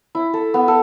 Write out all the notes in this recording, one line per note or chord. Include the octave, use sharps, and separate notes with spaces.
E4
A4
B3
A4